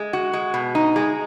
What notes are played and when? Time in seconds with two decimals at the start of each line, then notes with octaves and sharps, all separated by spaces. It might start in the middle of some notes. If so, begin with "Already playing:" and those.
Already playing: G#3
0.13 F#4
0.33 G#3
0.54 B2
0.75 D#4
0.96 G#3